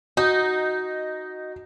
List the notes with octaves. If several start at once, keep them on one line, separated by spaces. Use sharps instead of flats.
D#4 F#4